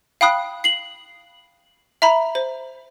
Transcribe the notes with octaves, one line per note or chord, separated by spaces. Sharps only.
F5 G5 B5 D#6 F#6
C7 F#7
E5 A#5 B5
C5